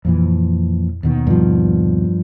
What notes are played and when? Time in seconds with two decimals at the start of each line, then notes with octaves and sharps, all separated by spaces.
0.05 F2 A#2 E3
1.03 D#2 B2 D#3
1.27 G2 F3